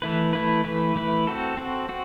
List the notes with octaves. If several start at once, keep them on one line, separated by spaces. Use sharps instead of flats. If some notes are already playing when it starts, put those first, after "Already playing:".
E3 A3 E4 B4
E3 A3 E4 B4
E3 A3 E4 B4
E3 A3 E4 B4
C4 F#4 A4
C4 F#4 A4
C4 F#4